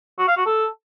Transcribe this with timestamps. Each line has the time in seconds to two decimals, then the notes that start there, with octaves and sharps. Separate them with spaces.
0.19 F#4
0.28 F5
0.37 F#4
0.46 A4